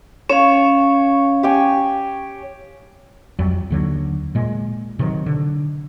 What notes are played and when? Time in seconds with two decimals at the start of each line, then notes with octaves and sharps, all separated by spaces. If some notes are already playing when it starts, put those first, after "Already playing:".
0.30 C#4 C#5 F5
1.43 G4 G5 G#5
3.39 F2 F#3 G3
3.70 D#2 D3 F#3
4.35 A#2 G#3
4.99 C3 D#3 F#3
5.26 D3